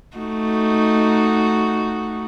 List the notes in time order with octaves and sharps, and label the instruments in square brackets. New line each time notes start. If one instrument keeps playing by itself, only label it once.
[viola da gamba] A3 D#4 F#4